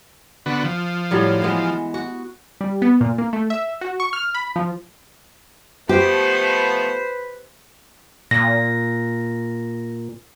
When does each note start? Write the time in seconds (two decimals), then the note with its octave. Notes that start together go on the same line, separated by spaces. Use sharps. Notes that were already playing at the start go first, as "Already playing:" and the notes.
0.46 D3 B3 F#4
0.64 F3
1.11 A2 F#3 G3
1.42 E3 G#3 B3
1.94 F#4
2.61 G3
2.82 B3
3.01 A#2
3.18 A#3
3.33 A3
3.50 E5
3.81 F#4
4.00 C#6
4.13 F6
4.34 B5
4.56 F3
5.89 F3 A3 B3 G4 B4 C5
8.31 A#2 A#6